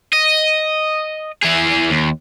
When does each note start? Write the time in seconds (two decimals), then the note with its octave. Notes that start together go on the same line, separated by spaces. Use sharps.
0.13 D#5
1.43 E3 G#4
1.90 D#2